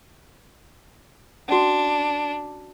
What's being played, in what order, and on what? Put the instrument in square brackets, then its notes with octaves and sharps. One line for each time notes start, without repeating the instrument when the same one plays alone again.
[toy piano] C#4 F#4 [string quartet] D4